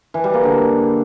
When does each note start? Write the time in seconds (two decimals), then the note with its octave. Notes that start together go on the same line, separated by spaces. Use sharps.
0.14 E3
0.24 G3
0.34 A#3
0.43 D3